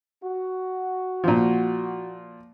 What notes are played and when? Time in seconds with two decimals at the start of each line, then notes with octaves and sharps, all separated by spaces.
0.23 F#4
1.24 A#2 F3